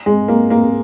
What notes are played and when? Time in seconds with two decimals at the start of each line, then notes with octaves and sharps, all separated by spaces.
0.06 G#3
0.28 A#3
0.50 A#3